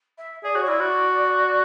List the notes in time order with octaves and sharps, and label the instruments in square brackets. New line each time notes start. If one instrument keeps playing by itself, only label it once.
[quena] E5
[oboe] G#4 [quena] D5
[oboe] F#4 [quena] C#5
[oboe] E4 [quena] D5
[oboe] F#4